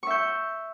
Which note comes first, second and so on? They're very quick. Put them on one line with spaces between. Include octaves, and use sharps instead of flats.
C#6 E5 G6